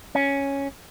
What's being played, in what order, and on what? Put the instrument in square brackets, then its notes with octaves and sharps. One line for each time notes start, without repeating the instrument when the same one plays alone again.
[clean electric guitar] C#4